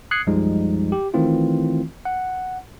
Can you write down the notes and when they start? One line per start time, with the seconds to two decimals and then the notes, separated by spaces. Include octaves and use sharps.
0.11 D#6 F#6 G#6 C7 C#7
0.27 B1 F#2 F3 G3 G#3 D#4
0.92 G4
1.14 D#3 E3 A3 C4 E4 F4
2.05 F#5